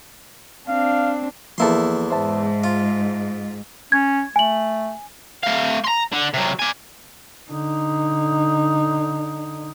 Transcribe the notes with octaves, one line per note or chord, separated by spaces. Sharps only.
C4 D4 F5
E2 F3 A#3 E4 A4 C6
G#2 C5 E5 A5
F4
C#4 G#6
A3 G#5 F#7
A3 F5
A#5 C6
D3
C3 F#3
D5 G#5
D3 D#4